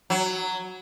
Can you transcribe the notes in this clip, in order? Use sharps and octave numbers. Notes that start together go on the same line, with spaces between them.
F#3